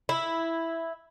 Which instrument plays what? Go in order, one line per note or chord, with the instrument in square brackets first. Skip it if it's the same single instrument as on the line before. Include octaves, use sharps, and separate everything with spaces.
[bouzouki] E4